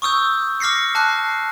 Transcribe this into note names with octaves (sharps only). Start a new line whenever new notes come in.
C#6 D#6 E6 G6
D6 F6 A#6 C7 C#7
A5 D6 F#6 C7